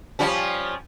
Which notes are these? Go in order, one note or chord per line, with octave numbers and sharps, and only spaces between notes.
F3 G3 C#4